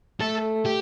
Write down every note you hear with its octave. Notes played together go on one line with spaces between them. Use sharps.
A3 A4
G4